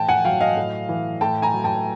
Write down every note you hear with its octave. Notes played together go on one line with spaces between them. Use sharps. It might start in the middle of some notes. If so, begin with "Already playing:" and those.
Already playing: A2 E3 G5 A5
F#5 G#5
F#3 F5 G5
D#5 F5
A2
E3
A2 G5 A5
G#5 A#5
F#3
G5 A5